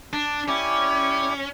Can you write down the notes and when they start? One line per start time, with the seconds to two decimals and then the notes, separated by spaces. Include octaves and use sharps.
0.13 D4
0.48 C#4 E4 G4 D5